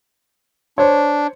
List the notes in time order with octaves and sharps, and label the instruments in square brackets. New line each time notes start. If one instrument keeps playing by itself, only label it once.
[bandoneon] D4 [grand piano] C5 C#5